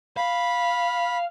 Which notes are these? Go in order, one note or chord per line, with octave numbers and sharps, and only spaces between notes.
F5 B5